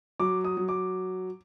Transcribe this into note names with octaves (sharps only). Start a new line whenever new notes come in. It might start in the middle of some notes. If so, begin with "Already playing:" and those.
F#3 D6
D#6
F#3
D6